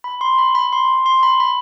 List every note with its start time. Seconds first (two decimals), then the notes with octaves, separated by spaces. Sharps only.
0.04 B5
0.21 C6
0.38 B5
0.55 B5
0.73 C6
1.06 C6
1.23 B5
1.40 B5